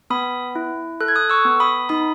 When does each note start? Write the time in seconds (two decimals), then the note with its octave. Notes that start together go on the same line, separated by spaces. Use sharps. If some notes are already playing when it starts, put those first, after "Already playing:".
0.10 B3 B5 D#6
0.55 E4
1.01 A4 F#6
1.08 G#6
1.16 D#6 F#6
1.30 C#6 E6
1.45 B3
1.60 B5 D#6
1.89 D#4 B5 D#6